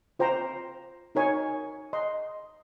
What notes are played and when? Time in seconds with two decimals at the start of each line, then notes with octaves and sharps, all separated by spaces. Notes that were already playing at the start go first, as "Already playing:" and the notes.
0.19 F4 C5 G5 A#5
1.15 D#4 A#4 C#5 G#5
1.93 D#5 C6